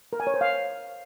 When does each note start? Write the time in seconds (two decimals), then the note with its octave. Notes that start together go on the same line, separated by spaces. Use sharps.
0.13 A#4
0.20 G#5
0.27 C#5
0.34 C5
0.41 F5